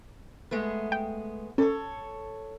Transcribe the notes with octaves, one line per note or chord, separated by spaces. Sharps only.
G#3 A3 B3
G5
C#4 A4 C#5